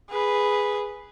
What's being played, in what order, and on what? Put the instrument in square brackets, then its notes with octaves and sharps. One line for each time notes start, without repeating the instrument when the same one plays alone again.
[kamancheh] G#4 B4